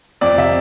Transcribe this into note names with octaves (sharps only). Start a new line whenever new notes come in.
F2 D5
C3 E5